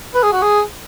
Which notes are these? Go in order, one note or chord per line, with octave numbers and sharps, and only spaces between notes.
B4
G#4
F#4
G#4